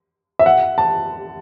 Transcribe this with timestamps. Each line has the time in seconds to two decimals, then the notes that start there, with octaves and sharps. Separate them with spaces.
0.39 E5
0.46 F#5
0.78 A5